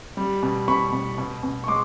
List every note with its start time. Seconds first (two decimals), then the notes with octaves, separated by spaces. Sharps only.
0.17 G3
0.43 B2
0.68 B2 B5 C#6
0.92 B2
1.18 B2
1.43 B2
1.64 C#6
1.68 G#3 C6 D6